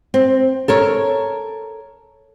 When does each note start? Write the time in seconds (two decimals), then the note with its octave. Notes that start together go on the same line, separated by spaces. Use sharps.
0.14 C4
0.68 A4 A#4 C#5